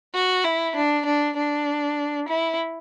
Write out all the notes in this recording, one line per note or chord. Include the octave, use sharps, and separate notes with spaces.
F#4
E4
D4
D4
D4
E4